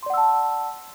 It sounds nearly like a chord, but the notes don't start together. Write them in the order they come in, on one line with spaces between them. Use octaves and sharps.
C6 D5 F#5 E6 A5